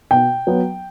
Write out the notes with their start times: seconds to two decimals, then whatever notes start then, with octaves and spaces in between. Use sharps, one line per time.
0.11 B2 G5
0.47 F#3 B3